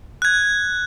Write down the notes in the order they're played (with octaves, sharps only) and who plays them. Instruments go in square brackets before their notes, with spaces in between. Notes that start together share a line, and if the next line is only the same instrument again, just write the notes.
[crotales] F#6 G#6